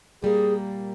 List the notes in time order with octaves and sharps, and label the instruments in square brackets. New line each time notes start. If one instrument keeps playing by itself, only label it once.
[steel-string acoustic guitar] A#2 G3 A#3 [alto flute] G#4